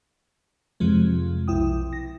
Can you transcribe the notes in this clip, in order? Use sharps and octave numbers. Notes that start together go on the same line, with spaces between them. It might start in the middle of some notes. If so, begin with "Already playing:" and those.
F2 C3 F3 G#3
B1 E4 G5 D#6
A#6